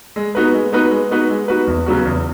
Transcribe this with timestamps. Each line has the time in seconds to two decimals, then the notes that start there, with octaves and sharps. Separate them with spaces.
0.16 G#3
0.35 B3 D#4 F#4 B4
0.54 G#3
0.73 B3 D#4 F#4 B4
0.91 G#3
1.11 B3 D#4 F#4 B4
1.30 G#3
1.48 B3 D#4 F#4 B4
1.67 E2
1.86 C#3 F#3 B3 F#4
2.05 E2